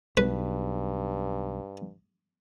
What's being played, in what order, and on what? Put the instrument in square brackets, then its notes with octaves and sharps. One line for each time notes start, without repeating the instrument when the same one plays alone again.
[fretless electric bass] B1 [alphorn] G2 [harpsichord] B4